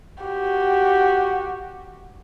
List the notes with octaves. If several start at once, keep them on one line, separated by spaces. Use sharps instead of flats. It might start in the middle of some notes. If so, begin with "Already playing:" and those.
F#4 G4